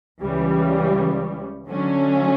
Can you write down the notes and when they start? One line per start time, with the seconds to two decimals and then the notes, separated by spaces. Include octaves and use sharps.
0.21 C#2 C#3 E3 G3
1.68 D3 F#3 A3 C#4